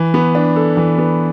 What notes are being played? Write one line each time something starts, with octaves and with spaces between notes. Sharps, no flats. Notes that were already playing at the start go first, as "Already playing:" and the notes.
Already playing: E3
B3
D4
A4
E3
B3